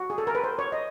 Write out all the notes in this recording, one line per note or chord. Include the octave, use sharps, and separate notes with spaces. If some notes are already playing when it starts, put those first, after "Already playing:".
Already playing: F#4
G#4
A4
A#4
B4
C5
C#5
D#5